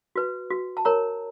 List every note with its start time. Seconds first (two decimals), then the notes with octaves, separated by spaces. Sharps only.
0.16 F#4 B4
0.50 F#4
0.77 A5
0.85 A#4 C#5 A#5